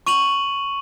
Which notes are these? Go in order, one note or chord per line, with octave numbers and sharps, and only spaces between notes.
C#6 D#7 F7 F#7